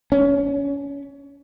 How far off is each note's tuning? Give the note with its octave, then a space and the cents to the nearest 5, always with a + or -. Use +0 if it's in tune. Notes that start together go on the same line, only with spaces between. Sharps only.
C#4 +25